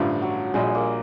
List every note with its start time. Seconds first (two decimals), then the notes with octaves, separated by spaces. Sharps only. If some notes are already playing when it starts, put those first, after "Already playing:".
Already playing: A1 G2 D3 F3 G3
0.22 F#3
0.54 A#1 A#2 G3 G#3
0.75 A#3